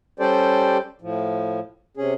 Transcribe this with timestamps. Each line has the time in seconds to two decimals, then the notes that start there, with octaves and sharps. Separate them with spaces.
0.20 G3 C#4 G4 A4 C5 D5
1.01 A2 F3
1.97 C3 C#4 G#4